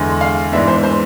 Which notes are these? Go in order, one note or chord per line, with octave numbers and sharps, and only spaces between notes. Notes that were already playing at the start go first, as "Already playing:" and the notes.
Already playing: E2 D3 G#3
F5
G#2 E3 G#3 B3 D4 E5
C5
C5